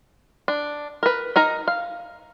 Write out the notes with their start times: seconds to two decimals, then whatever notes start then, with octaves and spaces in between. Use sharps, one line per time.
0.48 D4
1.03 A#4 B4
1.36 D#4 A#4 A#5
1.68 F5